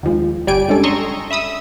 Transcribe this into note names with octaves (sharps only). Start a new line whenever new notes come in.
D#2 D#3 F3 G#3
G1 G3 D5 G5 G#5 D7
G3 G#3 C#4 D4 A4
A#5 C6 C#6 D#6 E6
E5 B5 D#6 E6